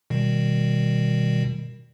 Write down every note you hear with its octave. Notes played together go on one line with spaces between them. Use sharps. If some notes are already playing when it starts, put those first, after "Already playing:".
B2 D#3 G3